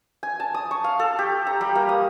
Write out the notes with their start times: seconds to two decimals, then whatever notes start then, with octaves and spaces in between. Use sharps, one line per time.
0.23 G#5
0.40 A5
0.54 D#6
0.71 C#6
0.84 F5
0.99 A4
1.19 G4
1.47 A#5
1.61 G3
1.75 A#3
1.89 D#6